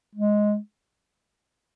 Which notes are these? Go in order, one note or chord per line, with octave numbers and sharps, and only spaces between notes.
G#3